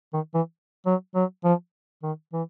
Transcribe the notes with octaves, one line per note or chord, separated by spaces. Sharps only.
D#3
E3
F#3
F#3
F3
D#3
E3